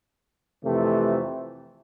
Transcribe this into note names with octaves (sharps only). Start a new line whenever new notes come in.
F2 C3 E3 A3